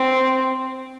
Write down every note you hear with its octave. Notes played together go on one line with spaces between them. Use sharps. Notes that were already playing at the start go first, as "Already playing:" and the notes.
Already playing: C4